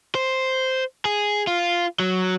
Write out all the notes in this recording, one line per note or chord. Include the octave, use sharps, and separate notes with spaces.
C5
G#4
F4
F#3